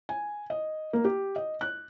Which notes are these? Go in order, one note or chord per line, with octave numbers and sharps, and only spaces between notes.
G#5
D#5
A#3
G4
D#5
F#6